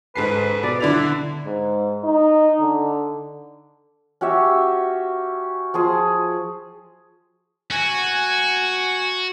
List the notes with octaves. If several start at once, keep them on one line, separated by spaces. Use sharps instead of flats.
G#2 A4 B4 C7
B2 D5
D3 E4 D5 F7
G#2
D#4
D3
C#4 F#4 G4 E5
F3 G#4 C6
F#4 G#5